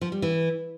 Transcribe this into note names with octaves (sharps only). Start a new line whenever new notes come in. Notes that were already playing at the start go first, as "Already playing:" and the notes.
F3
G3
E3